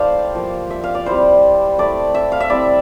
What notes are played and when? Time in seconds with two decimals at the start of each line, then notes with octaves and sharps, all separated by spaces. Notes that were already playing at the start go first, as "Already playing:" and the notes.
Already playing: A3 E4 G4 C5 D5 F5
0.35 F3 A#3 F4
0.70 E5
0.84 F5
0.95 D5
1.06 G3 C4 E4 C5
1.78 A3 E4 D5
2.15 E5
2.32 F5
2.40 E5
2.50 G3 C4 E4 D5